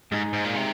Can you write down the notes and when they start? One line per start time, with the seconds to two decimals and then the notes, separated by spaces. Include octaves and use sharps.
0.12 G#2 G#3 D#4 G#4
0.33 G#2
0.45 A#2
0.55 C3